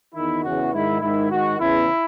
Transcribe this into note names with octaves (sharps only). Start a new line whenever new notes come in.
E2 D#3 E4
E2 C#3 E3 F#4
G#2 D#3 E4
G#2 D#3 E4
G#2 D#3 F#4
E2 C#3 E3 E4